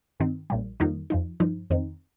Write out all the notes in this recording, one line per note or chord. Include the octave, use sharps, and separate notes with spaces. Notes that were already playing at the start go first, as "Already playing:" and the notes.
G2 D#3 C4 D#4
A#1 A#2 G3
F2 D#3 G3 A#3 D#4
F2 F3 D#4
G2 F3 D#4
F2 D#3 C4 D#4